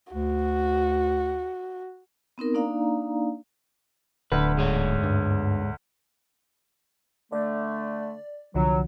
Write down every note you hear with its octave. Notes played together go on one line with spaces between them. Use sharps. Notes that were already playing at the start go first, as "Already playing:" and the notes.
D2 F#4
B3 C4 D#4 A#4
A#3 D4 D#4 D5 F5 A#5
D1 D2 B4
G#2 G#4 C#5
G2
D3 A3 D5
C2 D3 F3 F#3